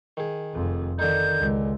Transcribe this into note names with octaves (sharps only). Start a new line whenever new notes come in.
D#3 G#4
F1 F2
D3 D#3 D#4 G6
C#2